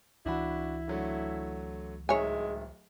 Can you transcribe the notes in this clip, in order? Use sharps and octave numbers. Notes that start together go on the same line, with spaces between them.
C#2 E3 D4 E4 F#4 B5
D3 F#3 A3
D1 D#3 G#3 C#5 E5 G#5